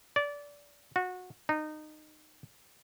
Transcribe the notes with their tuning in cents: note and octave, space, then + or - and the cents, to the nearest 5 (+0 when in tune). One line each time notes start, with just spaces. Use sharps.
D5 -20
F#4 -20
D#4 -20